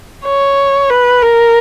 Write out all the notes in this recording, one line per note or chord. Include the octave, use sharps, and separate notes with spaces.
C#5
B4
A#4